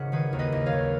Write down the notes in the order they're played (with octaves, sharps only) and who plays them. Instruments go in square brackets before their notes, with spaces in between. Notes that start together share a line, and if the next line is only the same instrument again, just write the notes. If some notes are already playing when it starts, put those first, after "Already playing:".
Already playing: [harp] G#1 C#3 F#5
D#3 G#4 B4
D#2
B4 D#5
D#2
C#5 F5
D#3